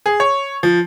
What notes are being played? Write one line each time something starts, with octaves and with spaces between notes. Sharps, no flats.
G#4
C#5
F3